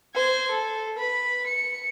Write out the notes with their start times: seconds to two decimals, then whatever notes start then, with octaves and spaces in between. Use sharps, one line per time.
0.15 C5 G#6
0.51 A4
0.98 B4 B5
1.47 C#7